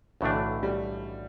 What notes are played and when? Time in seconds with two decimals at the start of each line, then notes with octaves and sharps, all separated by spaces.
0.21 B1 A2 D3 E3 A3 D4
0.63 G3